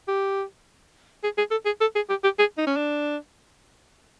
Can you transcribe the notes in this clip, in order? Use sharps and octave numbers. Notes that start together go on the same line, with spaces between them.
G4
G#4
G#4
A4
G#4
A4
G#4
G4
G4
G#4
D#4
C#4
D4